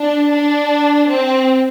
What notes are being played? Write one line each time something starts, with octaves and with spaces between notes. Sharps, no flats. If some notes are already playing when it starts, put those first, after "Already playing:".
Already playing: D4
D4
C4